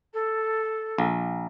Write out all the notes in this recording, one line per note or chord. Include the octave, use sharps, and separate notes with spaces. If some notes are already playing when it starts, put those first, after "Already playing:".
A4
A#1